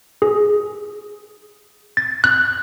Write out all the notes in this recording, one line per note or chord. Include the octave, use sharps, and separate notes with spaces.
G#4
A6
F#6